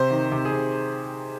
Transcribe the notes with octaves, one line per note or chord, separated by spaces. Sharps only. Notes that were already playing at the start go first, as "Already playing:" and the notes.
Already playing: C3 C5
D#3
C3
G#4
C3